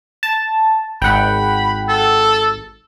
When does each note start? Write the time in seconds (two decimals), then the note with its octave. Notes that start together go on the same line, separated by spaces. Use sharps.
0.23 A5
1.02 G#1 F#5 G5 B5
1.89 A4